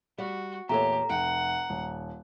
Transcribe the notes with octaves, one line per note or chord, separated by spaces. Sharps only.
G3 F#4 D5 F#5
E2 A#2 A3 G4 A4 C#5 A#5
F1 F#5 G5
D#1